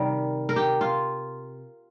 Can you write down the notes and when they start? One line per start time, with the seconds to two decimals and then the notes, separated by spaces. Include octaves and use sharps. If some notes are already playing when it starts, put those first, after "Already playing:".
Already playing: C3 D#3 G3 A#4
0.49 A#4
0.56 G4
0.81 F4